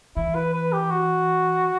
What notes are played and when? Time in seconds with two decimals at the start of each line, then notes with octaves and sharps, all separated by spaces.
0.16 E3 E4
0.35 B4
0.54 B4
0.73 G4
0.91 F#4